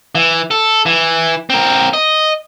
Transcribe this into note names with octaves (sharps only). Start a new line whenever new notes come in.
E3
A4
E3
C4 A#4
D#5